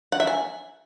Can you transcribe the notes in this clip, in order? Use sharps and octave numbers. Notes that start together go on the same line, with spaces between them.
F#5
E5
G#5